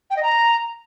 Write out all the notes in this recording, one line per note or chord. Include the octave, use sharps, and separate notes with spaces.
G5
D#5
A#5